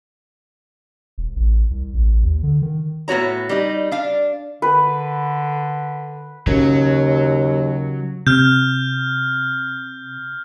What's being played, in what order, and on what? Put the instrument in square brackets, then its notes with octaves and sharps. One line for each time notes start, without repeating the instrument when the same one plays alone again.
[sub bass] E1
A1
C2
A1
D#2
D3
D#3
[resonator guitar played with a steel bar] A2 B3 F#4 C#5 A#5
G3 D#4
D4 F5
[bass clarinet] D3 [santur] B4
[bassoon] D#2 [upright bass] C#3 [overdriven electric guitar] F#3
[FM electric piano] C3 [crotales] F6 G6